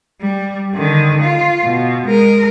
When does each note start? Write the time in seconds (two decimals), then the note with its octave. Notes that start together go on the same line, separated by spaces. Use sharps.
0.22 G3
0.75 D3 D#3
1.22 F4
1.64 B2
2.07 G#3 A#4